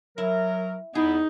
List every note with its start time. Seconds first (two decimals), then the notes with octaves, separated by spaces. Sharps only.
0.18 F#3 E4 A#4
0.95 E2 B3 D#4 E4 G#4